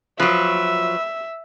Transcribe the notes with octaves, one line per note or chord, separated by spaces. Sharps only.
F3 F#3 B4 E5